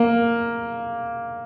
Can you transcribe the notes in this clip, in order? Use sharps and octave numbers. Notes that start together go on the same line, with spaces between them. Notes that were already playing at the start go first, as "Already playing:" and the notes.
Already playing: A#3